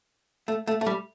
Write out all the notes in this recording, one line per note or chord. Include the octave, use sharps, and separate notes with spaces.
A3
A3
A3
G3